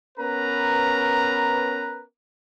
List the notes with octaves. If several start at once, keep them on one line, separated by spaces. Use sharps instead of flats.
B3 C#4 A#4 B4 A#5